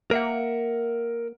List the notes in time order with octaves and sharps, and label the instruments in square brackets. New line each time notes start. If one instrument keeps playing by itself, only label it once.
[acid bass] A#3 [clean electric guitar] A#4 E5 F#5